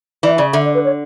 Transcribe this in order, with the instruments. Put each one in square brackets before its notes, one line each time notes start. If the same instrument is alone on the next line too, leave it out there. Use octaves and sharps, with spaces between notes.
[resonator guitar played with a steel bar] E3 [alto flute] D5
[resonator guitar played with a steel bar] C#3 [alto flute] D5
[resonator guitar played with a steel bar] D3 [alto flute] E5
[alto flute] D5
B4
C#5